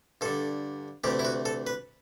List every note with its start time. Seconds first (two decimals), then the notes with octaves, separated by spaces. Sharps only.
0.21 G2 D3 A4
1.04 D2 C3 E3 G4
1.19 E4
1.25 F#4
1.45 A4
1.67 B4